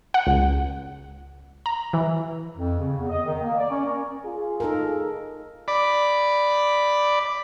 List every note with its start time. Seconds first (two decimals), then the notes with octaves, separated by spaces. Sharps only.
0.14 F#5
0.27 C#2
1.66 A#5
1.93 E3
2.55 F2
2.80 C#3
2.97 E2
3.10 D#5
3.26 D#3
3.42 A#3
3.57 D5
3.70 C#4
3.84 A#4
4.25 F4 G#4
4.60 D#4 A4 A#4
5.68 D5 B5